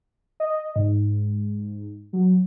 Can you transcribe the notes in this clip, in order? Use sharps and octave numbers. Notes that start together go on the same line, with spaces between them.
D#5
G#2
F#3